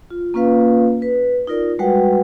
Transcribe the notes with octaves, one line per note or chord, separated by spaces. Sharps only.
F4
A#3 C#4 F4 B4 F5
B4
D#4 F4 A#4 D5
G3 G#3 F#4 B4 F#5 G5